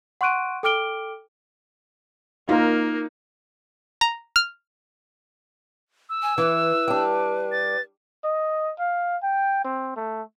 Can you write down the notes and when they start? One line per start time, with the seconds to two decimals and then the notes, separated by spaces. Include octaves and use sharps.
0.21 F#5 C6 C#6 F#6 D7 D#7
0.63 A4 G5 D6 F6 D7 G7
2.49 A#3 D#4 F4 A#4
4.01 A#5
4.36 F6
6.09 E6
6.22 G#5
6.38 E3 B4
6.88 G3 D4
7.52 A6
8.24 D#5
8.79 F5
9.23 G5
9.65 C4
9.96 A3